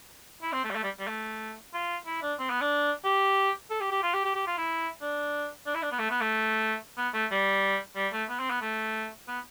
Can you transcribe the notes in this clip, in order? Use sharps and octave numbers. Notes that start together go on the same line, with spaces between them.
E4
C4
A3
G3
A3
G3
G3
A3
F4
E4
D4
C4
B3
D4
G4
A4
G4
G4
F4
G4
G4
G4
F4
E4
D4
D4
E4
D4
B3
A3
B3
A3
B3
A3
G3
G3
A3
B3
C4
B3
A3
B3